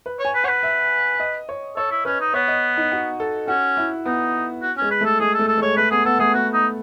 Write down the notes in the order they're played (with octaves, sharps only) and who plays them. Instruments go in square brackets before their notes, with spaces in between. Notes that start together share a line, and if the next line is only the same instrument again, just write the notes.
[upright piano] B4
[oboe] C#5
[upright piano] G#5
[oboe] B4
[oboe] C#5 [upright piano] F#5
[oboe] B4
[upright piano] E5
D#5
C#5
[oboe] A4 [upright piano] C#5
[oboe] E4
[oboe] C#4 [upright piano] B4
[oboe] D#4
[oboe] B3 [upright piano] C#5
[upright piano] D#5
D#4
F#4
A4
[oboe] C#4 [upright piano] F#4
[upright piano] E4
[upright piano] B3 [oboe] D#4
[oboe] F#4
[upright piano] G#3 [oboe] C#4
[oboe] B4
[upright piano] A3 [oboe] A4
[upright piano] G#3 [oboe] G#4
[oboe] A4
[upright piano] A3
[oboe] A4
[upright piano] G#3 [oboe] C#5
[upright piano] A3 [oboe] B4
[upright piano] B3 [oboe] G#4
[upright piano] B3 [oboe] A4
[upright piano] A3 [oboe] G#4
[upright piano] B3 [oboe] F#4
[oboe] D#4